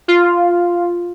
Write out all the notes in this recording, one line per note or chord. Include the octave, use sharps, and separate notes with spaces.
F4